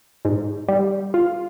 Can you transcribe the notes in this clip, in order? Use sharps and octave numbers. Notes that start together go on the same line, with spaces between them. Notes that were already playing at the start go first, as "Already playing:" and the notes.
G#2
G3
F4